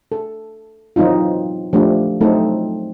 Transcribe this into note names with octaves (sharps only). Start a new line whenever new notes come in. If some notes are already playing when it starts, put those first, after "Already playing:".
A4
E3 F#3 C4 D#4 F4
F3 A3 D4 G4
F#3 A3 C4 D#4 A4